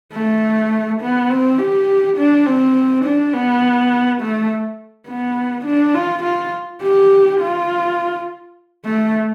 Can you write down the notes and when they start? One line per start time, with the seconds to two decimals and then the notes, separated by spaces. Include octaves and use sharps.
0.13 A3
1.01 B3
1.30 C4
1.58 G4
2.17 D4
2.46 C4
3.05 D4
3.33 B3
4.21 A3
5.08 B3
5.65 D4
5.95 F4
6.23 F4
6.82 G4
7.40 F4
8.85 A3